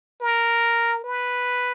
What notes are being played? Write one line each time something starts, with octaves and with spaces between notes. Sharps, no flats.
A#4
B4